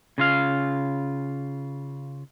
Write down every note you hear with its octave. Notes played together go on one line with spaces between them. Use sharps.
C#3 F4 F5